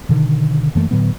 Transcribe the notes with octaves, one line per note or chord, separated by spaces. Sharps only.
B2 D3 D#3
F#2 E3 A3 A#3
A2 D3 F#3 B3